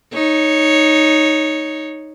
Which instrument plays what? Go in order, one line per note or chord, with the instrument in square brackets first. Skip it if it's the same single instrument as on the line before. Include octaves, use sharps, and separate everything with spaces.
[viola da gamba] D#4 C#5